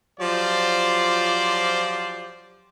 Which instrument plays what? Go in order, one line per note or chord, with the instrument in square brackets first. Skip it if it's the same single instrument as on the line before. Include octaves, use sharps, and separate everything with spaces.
[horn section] F3 F#3 F4 G4 C5 D5